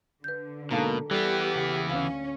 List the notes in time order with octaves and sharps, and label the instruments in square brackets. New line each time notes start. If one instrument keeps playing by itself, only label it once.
[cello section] D3 [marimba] B4 G6
[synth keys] G#2 A#3 [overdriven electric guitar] B2 [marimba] A4 A5 A#5
[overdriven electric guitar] E3 B3 [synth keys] G3 [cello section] G4 [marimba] A4
[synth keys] C#3
[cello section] D2 C#4 [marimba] F5